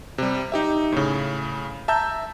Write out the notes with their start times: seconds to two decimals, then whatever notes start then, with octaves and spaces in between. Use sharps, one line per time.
0.18 C3 G3
0.52 D#4 G4 E5
0.92 A2 C#3
1.88 E5 A5 A#5 E6 G6